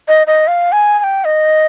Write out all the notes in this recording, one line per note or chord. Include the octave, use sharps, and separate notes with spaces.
D#5
D#5
F5
G#5
G#5
G5
D#5